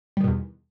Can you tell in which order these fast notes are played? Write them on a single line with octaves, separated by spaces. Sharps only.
G3 D#3 B2 E2